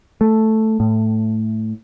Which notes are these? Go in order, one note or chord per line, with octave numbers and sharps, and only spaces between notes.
A3
A2